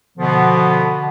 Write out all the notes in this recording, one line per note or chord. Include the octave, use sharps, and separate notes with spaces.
B2 D3 F3 B3